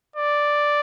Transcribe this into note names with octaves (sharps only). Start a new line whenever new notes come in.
D5